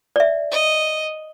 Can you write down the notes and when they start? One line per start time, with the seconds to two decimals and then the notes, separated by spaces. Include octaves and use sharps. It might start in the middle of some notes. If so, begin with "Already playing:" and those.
0.16 D5 E5
0.51 D#5